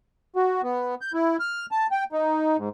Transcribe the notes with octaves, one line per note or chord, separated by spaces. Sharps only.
F#4
B3
G6
E4
F6
A5
G5
D#4
G#2